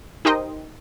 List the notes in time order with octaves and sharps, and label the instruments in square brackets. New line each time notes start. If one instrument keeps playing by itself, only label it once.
[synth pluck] D#4 G4 A#4 C5 D#5 G5